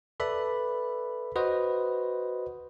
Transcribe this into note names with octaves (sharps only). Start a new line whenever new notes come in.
A4 B4 D5 E5 B5
F#4 B4 C5 D#5